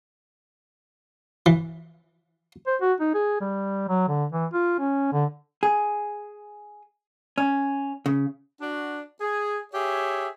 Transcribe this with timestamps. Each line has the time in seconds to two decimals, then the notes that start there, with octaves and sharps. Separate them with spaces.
1.46 E3
2.67 C5
2.81 F#4
3.00 D#4
3.14 G#4
3.41 G3
3.89 F#3
4.08 D3
4.32 E3
4.53 F4
4.79 C#4
5.12 D3
5.63 G#4
7.38 C#4
8.06 C#3
8.60 D4 F#4
9.21 G#4
9.73 G4 G#4 C#5 E5